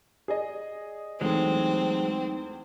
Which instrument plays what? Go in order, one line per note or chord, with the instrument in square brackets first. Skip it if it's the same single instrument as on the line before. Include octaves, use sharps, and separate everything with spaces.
[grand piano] G#4 D5 D#5
[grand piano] E2 A3 [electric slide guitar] F#3 G#3 [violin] C4 [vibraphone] D#4